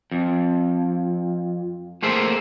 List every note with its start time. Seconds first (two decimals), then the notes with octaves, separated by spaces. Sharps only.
0.11 F2
2.02 A3 A#3 G#4 C5 E5